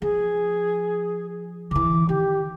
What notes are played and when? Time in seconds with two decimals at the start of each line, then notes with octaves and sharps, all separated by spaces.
0.02 F3 G#4
1.71 D3 E3 D6
2.09 D#3 G4